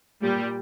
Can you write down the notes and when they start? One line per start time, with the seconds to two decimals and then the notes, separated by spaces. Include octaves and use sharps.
0.21 A#2 G3